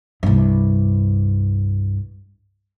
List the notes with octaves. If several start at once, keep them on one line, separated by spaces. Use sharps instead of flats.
C2 G2